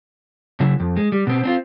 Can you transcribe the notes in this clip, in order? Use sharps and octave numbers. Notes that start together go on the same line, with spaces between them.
C#3 F#3 E4
F2
G#3
G3
B2 C4
C4 D4 F4